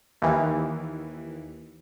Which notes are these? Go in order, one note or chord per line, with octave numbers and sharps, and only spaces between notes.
D#2 E3